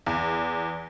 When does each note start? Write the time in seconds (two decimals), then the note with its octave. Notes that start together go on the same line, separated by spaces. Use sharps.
0.06 E2